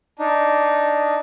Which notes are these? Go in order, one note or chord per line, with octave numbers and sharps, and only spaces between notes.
D4 D#4